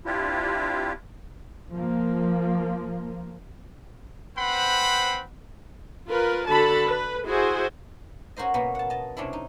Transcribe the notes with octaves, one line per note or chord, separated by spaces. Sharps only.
C4 D4 E4 F4 G4
F3 A#3
C4 B4 C5 F#5 B5
F4 A#4 B4
D3 F#4 A4 A5 B5
B4
E4 F#4 G#4 C5
C#4 F#4 A#4 C5 D#5
B2 A#3 B3 C#4
F#5 A5
D#5 A5
C3 C#4 D4 E4
D#4